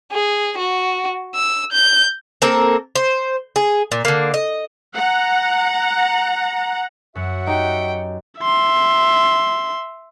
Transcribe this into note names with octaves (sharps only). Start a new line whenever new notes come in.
G#4
F#4
E6
G6
A#3 C4 A4 A#4
C5
G#4
A#2
D3 A#3
D#5
F#5 A#5
F#2 F#3 F#4 E5 F#5
D#4 G4 G5
E5 C6